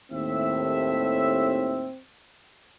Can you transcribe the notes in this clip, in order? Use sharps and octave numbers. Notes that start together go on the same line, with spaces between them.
D#2 A2 C4 E5